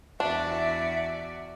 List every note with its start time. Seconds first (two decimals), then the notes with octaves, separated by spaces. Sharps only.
0.20 E2 D4 F#4 D5 E5